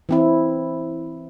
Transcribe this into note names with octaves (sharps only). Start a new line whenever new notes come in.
E3 C4 E4